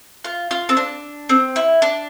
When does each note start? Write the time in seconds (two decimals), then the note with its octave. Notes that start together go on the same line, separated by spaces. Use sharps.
0.24 F4
0.51 F4
0.69 C4
0.77 D4
1.29 C4
1.56 E4
1.82 D4